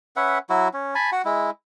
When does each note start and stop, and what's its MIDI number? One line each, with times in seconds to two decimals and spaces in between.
0.16 0.39 61
0.16 0.39 71
0.16 0.39 76
0.16 0.39 78
0.49 0.68 54
0.49 0.68 64
0.49 0.68 66
0.73 0.94 61
0.95 1.10 80
0.95 1.10 81
0.95 1.10 83
1.12 1.22 66
1.12 1.22 78
1.25 1.50 56
1.25 1.50 64